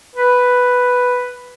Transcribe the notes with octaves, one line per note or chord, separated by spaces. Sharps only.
B4